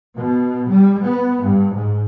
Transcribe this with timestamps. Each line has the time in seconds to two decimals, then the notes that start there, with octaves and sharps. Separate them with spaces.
0.16 B2
0.69 G3
1.03 B3
1.42 G2
1.73 G#2